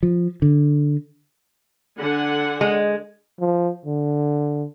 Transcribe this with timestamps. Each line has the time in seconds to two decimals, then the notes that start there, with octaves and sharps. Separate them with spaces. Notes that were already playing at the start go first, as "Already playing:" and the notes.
0.03 F3
0.42 D3
1.99 D3 F#5 G#5
2.61 G#3
3.40 F3
3.86 D3